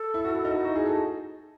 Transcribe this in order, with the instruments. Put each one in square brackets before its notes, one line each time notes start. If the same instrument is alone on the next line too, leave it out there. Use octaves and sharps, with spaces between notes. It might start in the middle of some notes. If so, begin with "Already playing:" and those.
Already playing: [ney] A4
[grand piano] E4
F#4
E4
D#4
F#4
[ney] D#4 [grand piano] E4
[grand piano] F#4
G#4
A4